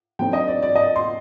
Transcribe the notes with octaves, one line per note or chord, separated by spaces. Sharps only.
D3 F#3 C4 D#4 G5
D#5
D5
D5
D#5
C6